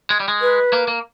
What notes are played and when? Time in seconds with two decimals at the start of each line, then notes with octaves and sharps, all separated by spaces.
0.10 G#3
0.20 G3
0.28 G#3
0.41 B4
0.73 A#3
0.88 A#3